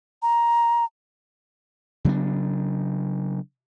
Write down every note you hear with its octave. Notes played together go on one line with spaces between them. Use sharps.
A#5
C#3 F#3 B3 D4